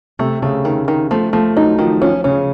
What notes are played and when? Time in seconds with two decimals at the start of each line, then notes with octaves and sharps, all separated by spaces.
0.19 C3 A3
0.42 C#3 A3
0.65 D#3
0.88 D#3
1.11 F3 A3
1.33 F3 A3
1.57 F#3 D#4
1.79 D#3 F3
2.01 F3 C#4
2.24 C#3 C#4